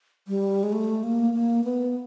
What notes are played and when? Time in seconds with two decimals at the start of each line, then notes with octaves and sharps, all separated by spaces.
0.28 G3
0.63 G#3
0.72 A3
1.04 A#3
1.34 A#3
1.64 B3